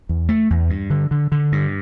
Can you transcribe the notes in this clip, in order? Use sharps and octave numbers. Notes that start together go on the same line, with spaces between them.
E2
A3
E2
G2
D3
D3
D3
G2